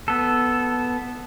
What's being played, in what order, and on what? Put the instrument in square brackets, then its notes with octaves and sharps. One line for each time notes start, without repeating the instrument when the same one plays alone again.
[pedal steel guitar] B3 A4